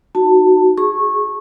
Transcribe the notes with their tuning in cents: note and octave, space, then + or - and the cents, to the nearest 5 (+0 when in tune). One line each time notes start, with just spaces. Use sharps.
D#4 +0 F#4 +0 A5 +20
G#4 +0 C#6 -20